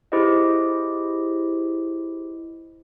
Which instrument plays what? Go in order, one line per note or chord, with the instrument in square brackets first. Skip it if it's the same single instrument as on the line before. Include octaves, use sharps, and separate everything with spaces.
[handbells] E4 G4 G#4 B4 C5 D#5